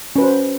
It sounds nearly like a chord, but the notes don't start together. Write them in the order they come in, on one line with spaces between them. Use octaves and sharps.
C#4 B4 F#4 C5